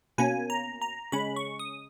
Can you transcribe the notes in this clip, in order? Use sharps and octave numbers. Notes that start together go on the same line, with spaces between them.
B2 A#3 C#4 G#5
A#5
A#5
C#3 G#3 C#4 B5
C#6
D#6